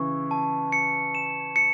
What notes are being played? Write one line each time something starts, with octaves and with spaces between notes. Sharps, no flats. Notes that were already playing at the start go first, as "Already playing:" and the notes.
Already playing: C#3 E3 C#6
A5
C#7
E7
C#7